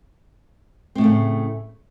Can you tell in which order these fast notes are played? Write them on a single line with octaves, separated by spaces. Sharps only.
C4 A2 C#3 A3